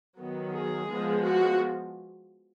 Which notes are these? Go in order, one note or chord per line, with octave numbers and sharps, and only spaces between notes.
D#3 F#3 B3
G#4
F3 G#3 B3
F#4